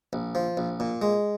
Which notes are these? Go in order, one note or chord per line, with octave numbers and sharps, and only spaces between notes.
A#1
F3
A#1
A#2
G#3